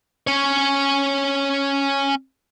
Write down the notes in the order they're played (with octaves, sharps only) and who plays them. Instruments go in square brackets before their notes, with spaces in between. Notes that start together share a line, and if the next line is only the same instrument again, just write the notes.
[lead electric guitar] C#4 C#5